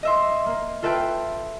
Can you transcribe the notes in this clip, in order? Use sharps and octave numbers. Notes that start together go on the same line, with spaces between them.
D#5 E5 C6
A#3
F4 A4 B4 E5 G5